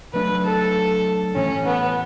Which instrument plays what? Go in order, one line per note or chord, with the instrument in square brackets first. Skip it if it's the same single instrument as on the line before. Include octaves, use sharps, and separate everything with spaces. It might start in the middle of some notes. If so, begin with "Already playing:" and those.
[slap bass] C#3 F#3 A3 D4 [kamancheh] B4
[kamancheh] A4
[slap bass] A2 E3 A3 [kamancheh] C#4
[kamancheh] B3